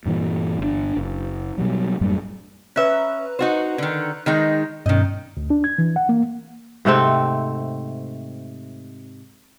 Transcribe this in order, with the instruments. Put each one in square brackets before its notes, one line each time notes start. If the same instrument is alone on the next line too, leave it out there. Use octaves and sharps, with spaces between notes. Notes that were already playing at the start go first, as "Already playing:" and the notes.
[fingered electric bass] G2 A#2 D3 E3
G1 D3 D4
F#1
B2 F#3 G3
F#2 A2 G3 A#3
[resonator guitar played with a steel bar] C#4 E5 [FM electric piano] B4 A#5 F#6
[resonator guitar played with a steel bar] D#4 F#4 C5
D3 D#3
D#3 G#3 D#4
[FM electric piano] G2 B2 C#4 [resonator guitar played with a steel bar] D#3 D#5
[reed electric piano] D2
D4
G#6
E3
F#5
A#3
[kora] G#2 C3 A3 C4